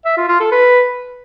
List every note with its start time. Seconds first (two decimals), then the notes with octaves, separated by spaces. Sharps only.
0.05 E5
0.17 F4
0.29 F4
0.40 A4
0.52 B4